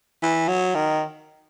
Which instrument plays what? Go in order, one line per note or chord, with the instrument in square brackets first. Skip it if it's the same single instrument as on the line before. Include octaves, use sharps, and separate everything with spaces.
[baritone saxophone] E3
F#3
D#3